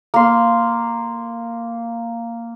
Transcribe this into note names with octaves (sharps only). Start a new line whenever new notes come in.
A#3 C6